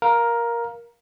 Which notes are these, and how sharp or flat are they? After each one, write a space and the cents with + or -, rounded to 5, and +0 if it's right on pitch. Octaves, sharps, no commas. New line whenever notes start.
A#4 +10 F5 +0